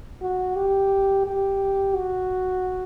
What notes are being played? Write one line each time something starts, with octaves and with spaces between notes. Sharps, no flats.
F#4
G4
G4
F#4